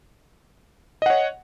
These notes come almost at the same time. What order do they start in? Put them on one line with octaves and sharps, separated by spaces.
D#5 F#5 C#5